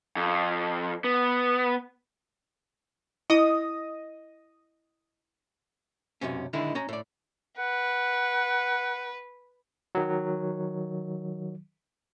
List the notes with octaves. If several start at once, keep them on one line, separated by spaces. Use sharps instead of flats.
F2
B3
E4 D#5 D#6
B1 F#2 C3 C#4
D3 D#3 G#3 D#4 E4
C#4 A#5
A2 D5
B4 F#5
D#3 F#3